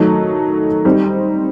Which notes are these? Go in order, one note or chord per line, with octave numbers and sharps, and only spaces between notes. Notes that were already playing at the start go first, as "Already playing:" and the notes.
Already playing: D#3 F#3 A3 D#4 A4
G3 C4 D#4